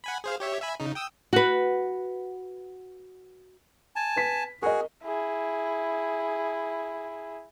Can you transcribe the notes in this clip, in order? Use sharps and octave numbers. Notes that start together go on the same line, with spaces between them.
F#5 G#5 B5
G#4 C5 F5
G4 C#5 E5
E5 G#5 B5
C#3 D#4
G5 D#6 E6
F#4 B4
G#5 A5
B4 B6
F#4 G#4 A#4 D#5
E4 G#4